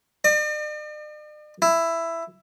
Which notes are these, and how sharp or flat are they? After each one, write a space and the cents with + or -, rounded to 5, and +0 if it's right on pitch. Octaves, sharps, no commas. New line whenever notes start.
D5 +45
E4 +10